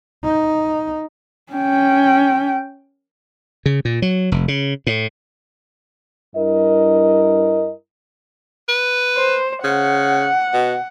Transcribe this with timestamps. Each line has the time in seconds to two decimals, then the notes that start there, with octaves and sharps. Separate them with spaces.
0.24 D#4
1.53 C#4 G5
3.66 C#3
3.85 A#2
4.02 F#3
4.32 F1
4.48 C#3
4.87 A2
6.36 G2 E4 A#4 D#5
8.69 B4
9.17 C5
9.64 C#3 F#5
10.54 B2